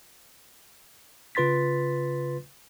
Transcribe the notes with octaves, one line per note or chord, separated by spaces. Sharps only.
C#3 F4 B4 C6 A6 B6